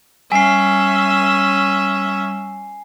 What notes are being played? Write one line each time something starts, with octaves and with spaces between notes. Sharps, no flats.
G3 C#4 E5 G#5 C7